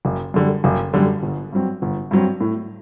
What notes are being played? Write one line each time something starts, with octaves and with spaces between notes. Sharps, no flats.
F#1
F#2 D3 G3
F#1
F#2 D3 G3
G1
G2 F#3 C4
G1
G2 F#3 C4
A2